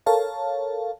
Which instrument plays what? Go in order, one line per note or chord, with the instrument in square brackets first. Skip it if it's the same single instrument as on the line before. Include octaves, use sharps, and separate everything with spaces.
[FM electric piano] A4 A#4 C#5 F5 A5